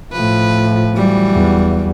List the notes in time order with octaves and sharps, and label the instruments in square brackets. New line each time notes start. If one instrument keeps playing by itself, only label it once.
[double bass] A2 F3 [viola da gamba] B4
[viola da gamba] E3 F#3 G3
[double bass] E2